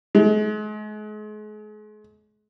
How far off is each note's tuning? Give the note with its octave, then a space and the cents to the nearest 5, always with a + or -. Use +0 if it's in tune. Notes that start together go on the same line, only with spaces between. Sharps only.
G#3 +40